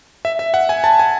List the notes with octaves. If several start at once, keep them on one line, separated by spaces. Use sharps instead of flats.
E5
E5
F#5
G#5
A5
G#5